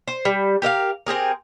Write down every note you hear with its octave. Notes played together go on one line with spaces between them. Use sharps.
C5
G3
G4 A#4 E5 F5
C4 G4 G#4 A#4